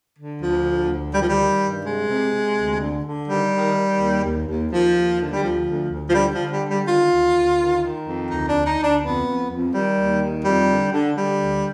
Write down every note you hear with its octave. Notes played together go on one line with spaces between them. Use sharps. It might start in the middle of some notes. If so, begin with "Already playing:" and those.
D3
D2 F3
D3
D2
D#3 G3
F3
G3
D#3
G2
C3 G#3
C3
C3
D2
D3
D3
D#3 G3
D#3
D#3
D#2
D#2
D#2
D#2 F3
D#2
D3
G3
D2 F3
D2
D2
F3
D3 G3
D3 F3
G3
D3
G3
D#3 F4
D2
D2
D#3
D#3
F2
D2 D#4
D2 D4
D#4
D2
D4
F2 B3
F2
F2
D#3 G3
D#2
D#3
F2 G3
D3
D3
D3 G3
D2